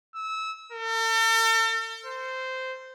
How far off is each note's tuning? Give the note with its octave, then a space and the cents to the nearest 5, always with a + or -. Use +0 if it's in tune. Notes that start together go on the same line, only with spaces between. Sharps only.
E6 -20
A4 +45
C5 -10